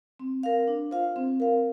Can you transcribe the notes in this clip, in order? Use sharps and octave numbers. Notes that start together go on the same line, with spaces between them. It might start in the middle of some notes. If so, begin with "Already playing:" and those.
C4
A#4 F5
D4
F4 C5 F5
C4
A#4 F5